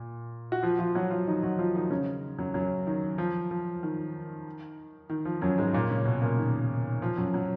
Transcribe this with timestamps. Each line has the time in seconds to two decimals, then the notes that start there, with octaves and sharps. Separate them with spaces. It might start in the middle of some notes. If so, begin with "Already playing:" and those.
Already playing: A#2
0.52 F#4
0.63 F3 F4
0.79 F3 F4
0.95 F#3 F#4
1.11 F3 F4
1.27 D#3 D#4
1.43 F#3 F#4
1.59 F3 F4
1.75 D#3 D#4
1.90 C#3 C#4
2.38 F#2 F#3
2.54 F#2 F#3
2.87 D#3
3.18 F3
3.51 F3
3.83 D#3
5.10 D#3
5.25 F3
5.42 F#2 F#3
5.58 G#2 G#3
5.74 A#2 A#3
5.90 C#3 C#4
6.05 B2 B3
6.22 A#2 A#3
6.38 D#3
7.02 F3
7.17 F#2 F#3
7.34 F#3